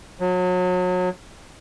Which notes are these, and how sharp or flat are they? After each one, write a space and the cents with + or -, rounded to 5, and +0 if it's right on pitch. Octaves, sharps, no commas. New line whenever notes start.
F#3 -30